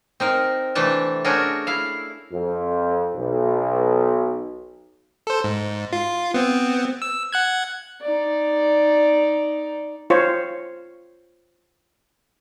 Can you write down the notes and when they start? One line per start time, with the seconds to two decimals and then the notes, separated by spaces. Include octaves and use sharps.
0.20 C4 D#4 A#4
0.75 C3 E3 A3 D4 A5
1.24 A3 C#4 D4 F#4 G#4 A#4
1.67 E4 F5
2.32 F2
3.15 B1
5.27 A4 C5
5.44 G#2
5.93 F4
6.34 B3 C4
7.02 E6
7.33 F#5 F#6 G#6
8.02 D#4 D5
10.10 F4 C5 C#5